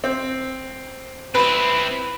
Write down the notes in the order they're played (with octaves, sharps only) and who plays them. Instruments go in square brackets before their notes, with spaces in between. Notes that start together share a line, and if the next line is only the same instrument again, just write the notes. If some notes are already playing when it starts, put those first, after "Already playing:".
[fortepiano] C4
[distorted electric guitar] C4 E4 [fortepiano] B4